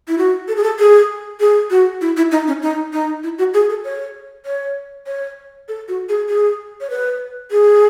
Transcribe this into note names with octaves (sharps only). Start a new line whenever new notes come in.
E4
F#4
A4
G#4
A4
G#4
G#4
F#4
E4
E4
D#4
C#4
D#4
D#4
E4
F#4
G#4
A4
C#5
C#5
C#5
A4
F#4
G#4
G#4
C#5
B4
G#4